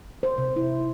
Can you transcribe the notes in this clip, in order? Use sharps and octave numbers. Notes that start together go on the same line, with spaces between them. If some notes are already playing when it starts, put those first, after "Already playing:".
C5
C3
E4